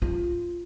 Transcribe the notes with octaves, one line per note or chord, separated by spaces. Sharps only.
F4